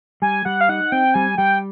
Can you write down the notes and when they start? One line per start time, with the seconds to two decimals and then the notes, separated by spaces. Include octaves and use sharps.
0.22 G3 G#5
0.45 G3 F#5
0.61 F5
0.69 D#4 F#5
0.92 C4 G5
1.14 G3 G#5
1.38 G3 G5